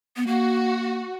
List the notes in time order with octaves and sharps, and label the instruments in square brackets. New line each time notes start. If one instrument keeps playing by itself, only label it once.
[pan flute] B3
[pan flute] A#3 [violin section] F#4